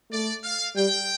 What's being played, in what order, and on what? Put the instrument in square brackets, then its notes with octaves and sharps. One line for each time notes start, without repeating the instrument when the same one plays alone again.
[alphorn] A3 [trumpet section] D5
[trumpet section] F5
[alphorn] G3 [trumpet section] G5